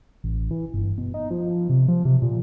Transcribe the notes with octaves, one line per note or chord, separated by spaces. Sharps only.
A1
E3
G1
B2
D#4
F3
F3
C3
F3
C3
A#2